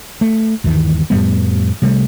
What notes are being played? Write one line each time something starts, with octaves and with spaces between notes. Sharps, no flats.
A3
G1 D#2 D#3 E3
F2 A2 G3 B3
C3 G3 A3